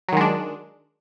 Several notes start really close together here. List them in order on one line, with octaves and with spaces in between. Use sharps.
F#3 D#3 G#3 D4